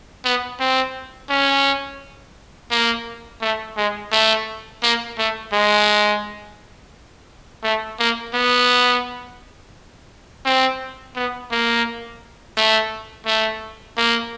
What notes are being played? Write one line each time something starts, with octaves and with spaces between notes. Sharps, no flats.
B3
C4
C#4
A#3
A3
G#3
A3
A#3
A3
G#3
A3
A#3
B3
C4
B3
A#3
A3
A3
A#3